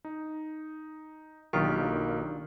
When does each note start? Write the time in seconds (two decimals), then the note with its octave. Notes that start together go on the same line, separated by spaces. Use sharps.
0.05 D#4
1.53 B1 D#3 F#3 A#3 D4 F4 G4 C#6